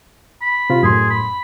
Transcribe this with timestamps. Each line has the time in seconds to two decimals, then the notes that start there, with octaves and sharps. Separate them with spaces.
0.41 B5
0.70 C3 F4
0.83 F#2 A2 G#4 C6
1.10 B5